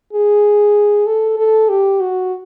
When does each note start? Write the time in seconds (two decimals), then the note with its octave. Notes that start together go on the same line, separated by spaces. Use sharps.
0.13 G#4
1.06 A4
1.38 A4
1.69 G4
2.01 F#4